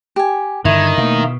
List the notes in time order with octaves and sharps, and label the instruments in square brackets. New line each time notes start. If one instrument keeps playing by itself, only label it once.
[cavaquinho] G4 G#5
[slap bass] G2 D3 [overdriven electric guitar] D#3 [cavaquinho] E4 [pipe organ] G#6
[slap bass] B2 [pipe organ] A3 A#3